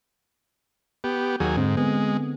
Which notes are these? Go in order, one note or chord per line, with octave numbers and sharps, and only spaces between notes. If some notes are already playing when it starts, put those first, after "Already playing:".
B3 G4
D#2 F#3 G#4
G#2 D3 C4
G#3 B3